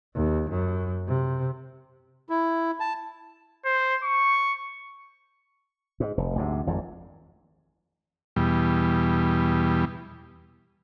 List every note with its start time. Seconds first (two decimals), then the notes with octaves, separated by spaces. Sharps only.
0.15 D#2
0.50 F#2
1.07 C3
2.29 E4
2.80 A5
3.65 C5
4.03 C#6
6.00 G#2
6.18 F1
6.36 D2 G#2 C3
6.67 G#1 F2 G#2
8.36 E2 B2 G3